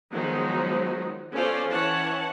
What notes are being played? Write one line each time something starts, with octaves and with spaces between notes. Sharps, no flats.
D#3 F3 F#3 G#3 B3 D#4
B3 C#4 F4 A4 C5 D5
E3 C#4 C#5 F#5 A5